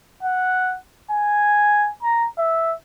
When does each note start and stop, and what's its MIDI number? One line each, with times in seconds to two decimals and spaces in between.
0.23 0.77 78
1.11 1.89 80
2.02 2.26 82
2.38 2.73 76